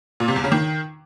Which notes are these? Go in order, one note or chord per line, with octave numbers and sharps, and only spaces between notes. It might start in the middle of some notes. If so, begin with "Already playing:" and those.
A#2
C3
E2
C#3
D#3